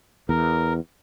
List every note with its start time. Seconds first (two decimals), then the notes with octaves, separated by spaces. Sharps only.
0.29 E2 A#4